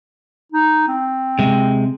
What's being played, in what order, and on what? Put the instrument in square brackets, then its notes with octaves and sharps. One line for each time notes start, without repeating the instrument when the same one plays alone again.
[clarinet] D#4
C4
[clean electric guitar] C3 G#3